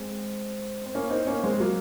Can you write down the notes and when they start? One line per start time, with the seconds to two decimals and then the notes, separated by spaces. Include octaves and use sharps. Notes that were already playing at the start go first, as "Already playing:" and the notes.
Already playing: G#3 C4
0.86 C4
0.95 A#3 C#4
1.10 C4 D#4
1.27 A#3 C#4
1.43 G#3 C4
1.60 F#3 A#3